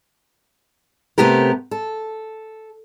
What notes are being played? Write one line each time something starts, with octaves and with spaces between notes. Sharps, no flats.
C3 A3 B3 G4 A#4
A4